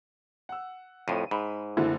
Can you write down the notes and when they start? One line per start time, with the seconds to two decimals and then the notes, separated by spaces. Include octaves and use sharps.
0.49 F#5 E6
1.08 F2 A2 D#7
1.31 G#2 B5
1.77 F#1 D3 G#3 A3 C4 E4 F#4